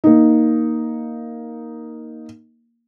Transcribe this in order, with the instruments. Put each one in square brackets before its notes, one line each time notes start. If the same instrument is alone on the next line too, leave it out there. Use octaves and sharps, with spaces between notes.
[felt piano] A#3 D#4